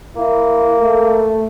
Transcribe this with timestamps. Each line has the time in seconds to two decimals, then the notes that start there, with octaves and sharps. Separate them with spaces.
0.16 A#3 E4
0.79 A3